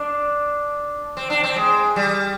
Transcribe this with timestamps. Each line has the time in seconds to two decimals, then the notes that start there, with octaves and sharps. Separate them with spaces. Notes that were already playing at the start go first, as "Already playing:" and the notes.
Already playing: D4
1.17 C4
1.30 D4
1.43 C4
1.56 G#3
1.96 G3